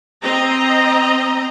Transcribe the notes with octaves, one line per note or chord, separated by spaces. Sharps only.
C4 D#5 A#5